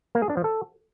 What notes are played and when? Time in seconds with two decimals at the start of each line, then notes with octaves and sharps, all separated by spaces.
0.15 A#3
0.22 G#4
0.30 D4
0.37 F3
0.44 A4